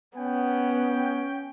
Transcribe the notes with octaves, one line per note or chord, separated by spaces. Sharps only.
B3 C#4 G5